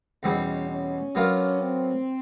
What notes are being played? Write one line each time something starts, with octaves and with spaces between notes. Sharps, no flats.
E2 B2 G3 C4 C#4 D#4
C#4
F#3 B3 D4 F4 A#4
C4